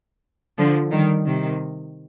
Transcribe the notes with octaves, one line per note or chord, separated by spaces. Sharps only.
D3 F3
D#3 G3
C3 D#3